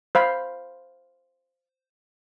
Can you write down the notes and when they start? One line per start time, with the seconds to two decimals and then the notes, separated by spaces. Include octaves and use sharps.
0.15 C5 F5 B5